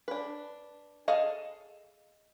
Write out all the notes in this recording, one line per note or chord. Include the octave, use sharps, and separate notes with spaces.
D4 B4
G#4 A4 D#5 F5